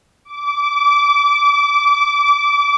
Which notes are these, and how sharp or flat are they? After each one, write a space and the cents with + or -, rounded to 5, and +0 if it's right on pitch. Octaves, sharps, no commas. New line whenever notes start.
D6 -20